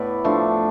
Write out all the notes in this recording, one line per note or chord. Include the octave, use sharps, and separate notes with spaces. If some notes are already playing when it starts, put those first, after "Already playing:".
Already playing: A2 B3 E4 B4 D5
F3 A3 D4